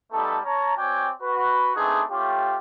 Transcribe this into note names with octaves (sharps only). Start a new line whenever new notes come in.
G3 A3 B3 D#4 A4
C#4 C#5 A5 A#5
C4 F#4 C#5 D5 G5 G#5
F#4 B4
A3 B3 C4 D4 D#4 G#4
A3 C#4 F4 G4